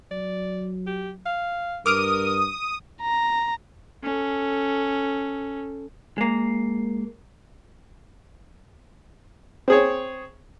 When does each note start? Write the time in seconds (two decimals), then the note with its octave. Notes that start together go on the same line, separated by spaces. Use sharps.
0.12 F#3 D5
0.87 G4
1.26 F5
1.86 G2 A#4 D6 D#6 F6 D7
3.02 A#5
4.03 C#4 A4
6.18 G#3 A#3
9.68 C4 G#4 C#5